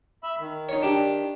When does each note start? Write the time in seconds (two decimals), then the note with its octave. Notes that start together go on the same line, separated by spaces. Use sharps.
0.23 E5 B5 E6
0.39 D#3
0.69 D#4 C#5
0.82 D4 G4